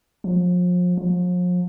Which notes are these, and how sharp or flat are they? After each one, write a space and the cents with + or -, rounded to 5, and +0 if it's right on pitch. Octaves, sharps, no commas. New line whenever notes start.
F3 +35
F3 +40